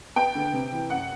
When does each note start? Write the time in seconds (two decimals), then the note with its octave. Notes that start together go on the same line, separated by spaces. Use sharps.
0.16 B3 G5
0.35 D3
0.53 C3
0.72 E3
0.90 F#2 F#5